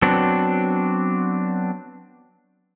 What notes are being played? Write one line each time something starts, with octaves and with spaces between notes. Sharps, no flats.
F#3 B3 C4 D4